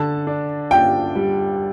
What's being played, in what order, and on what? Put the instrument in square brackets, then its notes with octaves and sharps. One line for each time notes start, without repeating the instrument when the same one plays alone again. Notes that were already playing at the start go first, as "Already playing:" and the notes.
Already playing: [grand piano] D3 [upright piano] A5
[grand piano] D4
[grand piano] F4 [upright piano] G5
[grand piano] G3